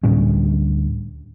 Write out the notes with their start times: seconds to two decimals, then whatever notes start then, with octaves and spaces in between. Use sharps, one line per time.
0.03 D2 A2 G3 C#4